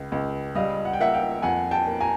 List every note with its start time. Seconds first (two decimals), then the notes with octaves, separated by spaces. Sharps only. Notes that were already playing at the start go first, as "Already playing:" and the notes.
Already playing: C#2
0.12 C#2
0.55 G3 D#5 F5
0.85 F#5
0.93 G5
1.00 A#3 E5 F#5
1.14 F5 G5
1.42 F2 F#5 G#5
1.71 G5 A5
1.87 A#3
2.00 G#5 A#5